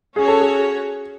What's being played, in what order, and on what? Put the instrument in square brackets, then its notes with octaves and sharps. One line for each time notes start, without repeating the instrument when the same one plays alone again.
[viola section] C#4 F#4 C#5 [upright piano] G#4
[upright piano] A4
G#4